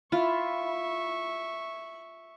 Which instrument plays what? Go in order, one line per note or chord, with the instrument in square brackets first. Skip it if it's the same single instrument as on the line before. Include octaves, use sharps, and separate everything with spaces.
[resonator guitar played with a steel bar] E4 [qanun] F4 [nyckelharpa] E5 C#6